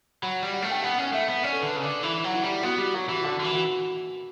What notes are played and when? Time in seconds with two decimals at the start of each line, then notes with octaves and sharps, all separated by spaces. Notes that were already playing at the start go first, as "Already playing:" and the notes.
0.22 F#3 B5
0.43 G3
0.53 F#5
0.62 A3
0.71 G5
0.82 B3 F#5
0.99 C#4 F#5
1.13 A3 E5
1.28 B3
1.43 C#4 D5
1.52 A4
1.58 D3 B4
1.73 C#3 A4
1.83 D3
2.03 E3 E4
2.24 F#3
2.34 E4
2.43 G3
2.63 B3 F#4
2.78 G3
2.94 F#3 F#4
3.09 E3
3.24 D3 F#4
3.40 D3
3.44 E3
3.55 F#4